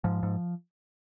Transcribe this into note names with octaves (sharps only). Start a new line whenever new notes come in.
G#2 F3
G#2